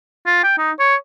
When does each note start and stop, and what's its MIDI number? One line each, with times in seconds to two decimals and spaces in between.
0.26 0.41 65
0.44 0.57 79
0.58 0.72 63
0.79 0.96 73